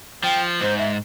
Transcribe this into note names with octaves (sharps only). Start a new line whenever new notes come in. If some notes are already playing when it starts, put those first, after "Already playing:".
F3 G5
G#2 C5
E5